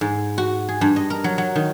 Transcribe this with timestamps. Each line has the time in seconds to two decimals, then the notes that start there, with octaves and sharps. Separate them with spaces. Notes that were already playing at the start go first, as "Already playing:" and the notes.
0.01 G#2
0.38 F#4
0.68 G#4
0.81 G2
0.96 D#5
1.10 A#4
1.24 F#3
1.38 F#3
1.56 D#3